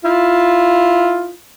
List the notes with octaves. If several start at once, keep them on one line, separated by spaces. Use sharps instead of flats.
E4 F4